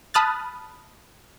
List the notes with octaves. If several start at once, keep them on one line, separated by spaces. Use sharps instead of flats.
A5 B5 D#6 F6 F#6 A6